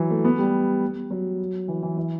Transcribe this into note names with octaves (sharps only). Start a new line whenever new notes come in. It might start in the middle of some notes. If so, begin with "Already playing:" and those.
Already playing: E3 F#3
A3
B3
G3
F#3
E3
E3
E3